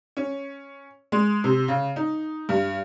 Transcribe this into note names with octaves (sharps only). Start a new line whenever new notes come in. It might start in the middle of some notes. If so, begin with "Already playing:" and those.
C#4
G#3
C3
C#3
D#4
G2